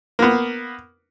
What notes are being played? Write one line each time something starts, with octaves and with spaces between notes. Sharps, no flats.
A#3 B3